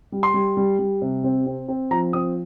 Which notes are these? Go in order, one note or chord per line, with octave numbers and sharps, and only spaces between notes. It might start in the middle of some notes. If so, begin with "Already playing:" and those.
G3
C6
G3
G3
G3
C3
C4
C4
C4
F3 A#5
C4 D#6